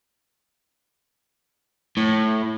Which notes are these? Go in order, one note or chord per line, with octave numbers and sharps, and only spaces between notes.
A2